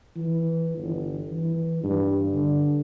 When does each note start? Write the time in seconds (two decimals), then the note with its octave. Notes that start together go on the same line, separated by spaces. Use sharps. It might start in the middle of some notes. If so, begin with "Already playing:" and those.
0.16 E3
0.77 G1
1.30 E3
1.83 G2
2.32 D3